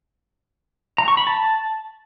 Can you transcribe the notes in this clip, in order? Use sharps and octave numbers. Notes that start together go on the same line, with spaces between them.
A#5
C#6
B5
A5